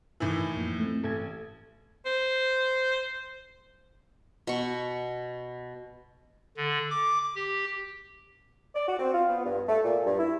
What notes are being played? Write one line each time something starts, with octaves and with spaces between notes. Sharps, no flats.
A2 D#3 E3 E4
F2 F3 A#3
A3 C4
A1 A4 G#6
C5
B2 C#6
D3
D6
G4
D5
F#4
C4
F4
B3
G2
A3
A#2
G2
E4